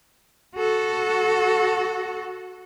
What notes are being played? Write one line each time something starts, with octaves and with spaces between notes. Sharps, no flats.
F#4 A4